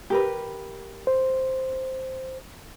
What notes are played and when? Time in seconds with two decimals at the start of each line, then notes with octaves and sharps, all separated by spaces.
0.10 G4 A#4 B4
1.07 C5